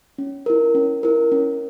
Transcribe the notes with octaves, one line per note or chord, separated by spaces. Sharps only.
C#4
E4 A#4
C#4
E4 A#4
C#4